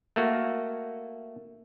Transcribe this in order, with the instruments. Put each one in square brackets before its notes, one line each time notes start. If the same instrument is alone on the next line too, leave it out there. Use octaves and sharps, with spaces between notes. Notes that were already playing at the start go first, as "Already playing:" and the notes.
[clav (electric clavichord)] A3 A#3 F#4